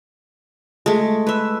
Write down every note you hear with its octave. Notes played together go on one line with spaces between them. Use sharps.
G#3 A3
B4 E5